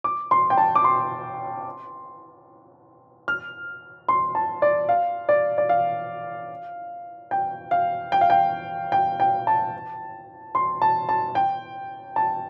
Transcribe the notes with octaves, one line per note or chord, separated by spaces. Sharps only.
D6
C6
G5
A5
D6
C6
F6
C6
A5
D5
F5
D5
D5
F5
G5
F5
G5
F5
G5
G5
G5
A5
C6
A5
A5
G5
A5